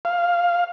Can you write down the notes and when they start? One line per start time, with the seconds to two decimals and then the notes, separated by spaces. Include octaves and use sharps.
0.05 F5